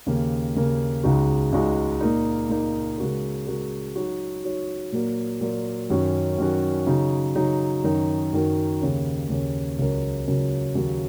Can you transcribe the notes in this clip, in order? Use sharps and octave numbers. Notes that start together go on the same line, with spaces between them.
D#2 C#3 A#3
D#2 C#3 A#3
C#2 C#3 G#3 D#4 F#4
C#2 C#3 G#3 D#4 F#4
A#2 A#3 D#4
A#2 A#3 D#4
C#3 G#3 F#4 A#4
C#3 G#3 F#4 A#4
F#3 D#4 F#4 C#5
F#3 D#4 F#4 C#5
A#2 F#3 A#3
A#2 F#3 A#3
F#2 D#3 F#3 C#4 F#4
F#2 D#3 F#3 C#4 F#4
C#3 F#3 D#4
C#3 F#3 D#4
F#2 D#3 F#3 D#4 A#4
F#2 D#3 F#3 D#4 A#4
D#2 C#3 A#3 C#4
D#2 C#3 A#3 C#4
C#2 C#3 F#3 C#4 A#4
C#2 C#3 F#3 C#4 A#4
D#2 C#3 F#3 A#3